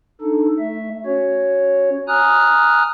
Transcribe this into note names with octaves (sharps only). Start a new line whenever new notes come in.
D4 D#4 A4
A3 E5
C#4 F#4 C#5
G#5 A#5 D#6 F6 F#6